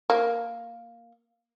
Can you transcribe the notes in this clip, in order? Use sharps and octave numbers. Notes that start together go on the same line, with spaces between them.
A#3